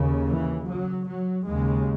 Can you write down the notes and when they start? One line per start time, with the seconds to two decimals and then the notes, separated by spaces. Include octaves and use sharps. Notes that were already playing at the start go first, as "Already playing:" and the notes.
Already playing: D#2 C#3
0.26 E3
0.66 F#3
1.07 F#3
1.46 D#2 C#3 G#3